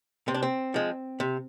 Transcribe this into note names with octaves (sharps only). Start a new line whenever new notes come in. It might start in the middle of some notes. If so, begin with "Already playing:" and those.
C3 C4
D4
C4
F3 G#3
C3